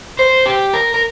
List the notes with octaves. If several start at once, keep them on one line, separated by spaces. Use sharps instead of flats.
C5
G4
A#4
A#4